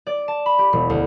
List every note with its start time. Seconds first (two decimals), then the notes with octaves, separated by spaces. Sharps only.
0.07 D5
0.28 A5
0.46 B5
0.58 G4
0.73 E1
0.90 D2